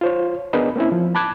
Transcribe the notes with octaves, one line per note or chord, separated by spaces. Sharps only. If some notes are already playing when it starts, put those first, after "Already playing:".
F4 C5 C#5
B3 D4 G#4 A#4 B4 D#5
A#3 C4 C#4 E4
F3
A5 B5 D6 F#6 G#6